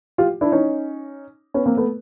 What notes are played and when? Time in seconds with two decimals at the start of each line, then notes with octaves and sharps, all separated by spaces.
0.18 F4 G4
0.41 D4 E4
0.52 C#4 D#4
1.54 B3 C#4
1.66 A#3 C4
1.77 A3 B3